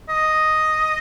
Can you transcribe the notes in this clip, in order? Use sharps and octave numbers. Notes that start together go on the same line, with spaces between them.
D#5